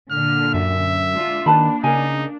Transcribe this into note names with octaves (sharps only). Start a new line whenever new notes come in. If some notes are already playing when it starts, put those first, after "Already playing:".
A#2 D3 F6
F#2 E5
G#3 D4 F4
D#3 A#3 D4 B4 A5 B5
C#3 D#4 A#4 G#5